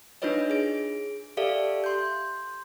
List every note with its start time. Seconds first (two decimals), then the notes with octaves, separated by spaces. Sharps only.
0.22 D4 D#4 F4 B4 C#5 D#5
0.50 G#4 D7
1.37 G4 A4 D5 E5 F5
1.84 C6 G6